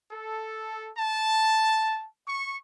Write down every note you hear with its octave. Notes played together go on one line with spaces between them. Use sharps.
A4
A5
C#6